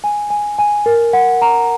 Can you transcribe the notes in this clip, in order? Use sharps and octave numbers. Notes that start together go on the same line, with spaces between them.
G#5
G#5
G#5
A#4
F#5
A#5